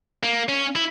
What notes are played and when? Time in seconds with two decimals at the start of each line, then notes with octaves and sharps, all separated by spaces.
0.23 A#3
0.49 C#4
0.76 E4